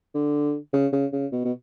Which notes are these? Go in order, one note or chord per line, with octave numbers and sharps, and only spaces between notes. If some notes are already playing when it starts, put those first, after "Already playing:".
D3
C#3
C#3
C#3
B2
B2